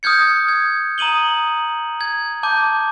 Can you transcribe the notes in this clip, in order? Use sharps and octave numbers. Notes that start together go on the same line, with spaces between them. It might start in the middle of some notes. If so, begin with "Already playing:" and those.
D#6 F6 G6 G#6 C#7
G#6
A#5 D#6 D#7 F#7 G7
G#6
A5 D6 G6